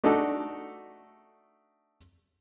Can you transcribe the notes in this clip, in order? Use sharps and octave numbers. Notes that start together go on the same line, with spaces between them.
A3 D4 D#4 F#4 A4